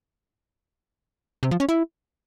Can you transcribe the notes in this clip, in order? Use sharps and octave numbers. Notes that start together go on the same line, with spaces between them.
C3
F3
C#4
E4